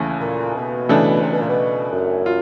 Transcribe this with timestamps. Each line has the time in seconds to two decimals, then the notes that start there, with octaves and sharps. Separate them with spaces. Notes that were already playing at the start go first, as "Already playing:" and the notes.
Already playing: D#2 C#3 E3 A3
0.21 A#2
0.55 B2
0.89 C#3 E3 A3 D4
1.23 C3
1.32 B2
1.40 A#2
1.49 B2
1.92 F#2
2.26 F4